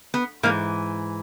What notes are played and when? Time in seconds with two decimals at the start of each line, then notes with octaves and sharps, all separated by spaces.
0.14 B3
0.43 G#2 E3 A#3